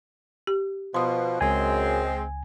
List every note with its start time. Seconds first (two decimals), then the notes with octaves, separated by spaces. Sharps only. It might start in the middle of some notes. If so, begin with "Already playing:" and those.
0.47 G4
0.94 B2 F3 C6 D#6
1.41 C#2 F#2 G#3 C4 G#5